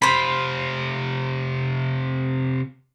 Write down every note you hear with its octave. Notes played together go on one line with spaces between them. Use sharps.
C3 F4 C5 B5